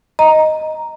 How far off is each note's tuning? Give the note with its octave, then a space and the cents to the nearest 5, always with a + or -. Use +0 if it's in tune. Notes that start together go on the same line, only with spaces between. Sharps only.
D#5 +0 A#5 +0